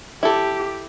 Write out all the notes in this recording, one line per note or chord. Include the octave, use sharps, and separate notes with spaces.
E4 G4 A4